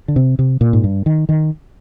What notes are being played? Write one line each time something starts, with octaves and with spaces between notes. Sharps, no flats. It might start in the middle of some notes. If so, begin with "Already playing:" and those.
D3
C3
C3
A#2
G#2
G2
D#3
D#3